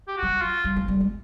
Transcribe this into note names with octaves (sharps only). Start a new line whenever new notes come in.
G4
F#4
G3
F#3
F4
G3
G#3
G3
G#3